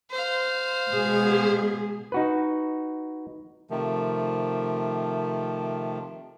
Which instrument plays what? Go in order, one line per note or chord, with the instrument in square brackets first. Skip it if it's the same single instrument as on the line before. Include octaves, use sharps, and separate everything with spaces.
[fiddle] C5 F5
[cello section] B2 G#3 G#4
[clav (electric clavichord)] D#4 F#4 B4
[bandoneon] C3 D#3 F3 A3